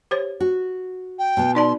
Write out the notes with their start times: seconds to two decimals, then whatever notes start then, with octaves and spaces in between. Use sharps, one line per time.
0.11 G4 C5 C#5
0.40 F#4
1.19 G5
1.37 B2 B3
1.55 D#4 D5 A5 C6